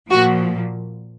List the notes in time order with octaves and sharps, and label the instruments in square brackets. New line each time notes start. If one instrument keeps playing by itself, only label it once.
[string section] A#2 F3 F#4